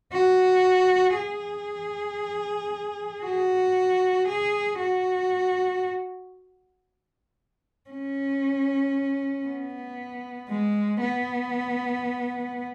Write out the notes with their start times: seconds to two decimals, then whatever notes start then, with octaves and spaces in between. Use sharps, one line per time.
0.13 F#4
1.17 G#4
3.24 F#4
4.28 G#4
4.79 F#4
7.90 C#4
9.45 B3
10.49 G#3
11.01 B3